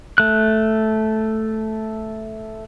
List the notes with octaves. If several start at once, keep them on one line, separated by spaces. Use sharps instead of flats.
A3 F#6